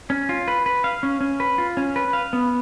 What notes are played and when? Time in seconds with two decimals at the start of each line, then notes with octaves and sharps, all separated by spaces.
0.10 C#4
0.29 F4
0.48 B4
0.66 B4
0.84 F5
1.03 C#4
1.21 C#4
1.40 B4
1.58 F4
1.77 C#4
1.96 B4
2.13 F5
2.33 B3